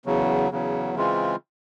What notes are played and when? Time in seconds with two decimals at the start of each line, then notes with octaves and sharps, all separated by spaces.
0.06 E2 C#3 F#3
0.51 E2 C#3 F#3
0.94 C#3 E3 G#3 C4 F4